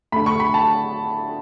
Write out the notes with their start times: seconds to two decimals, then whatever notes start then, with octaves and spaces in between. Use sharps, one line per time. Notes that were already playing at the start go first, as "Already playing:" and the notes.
0.12 D3 A3 B5
0.26 C#6
0.40 B5
0.54 A5